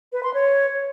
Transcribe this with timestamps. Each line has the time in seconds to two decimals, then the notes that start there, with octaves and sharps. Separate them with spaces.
0.13 B4
0.23 C6
0.34 C#5